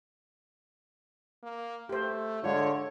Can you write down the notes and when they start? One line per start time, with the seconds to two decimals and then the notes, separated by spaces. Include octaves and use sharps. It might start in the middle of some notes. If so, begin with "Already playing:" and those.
1.43 A#3
1.89 A3 G4 C5
2.44 D3 G#3 F4 C#5